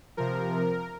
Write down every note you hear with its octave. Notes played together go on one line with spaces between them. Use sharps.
C3 F3 A#4